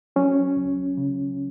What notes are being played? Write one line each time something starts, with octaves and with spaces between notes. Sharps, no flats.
F#3 C#4
C#2
C#3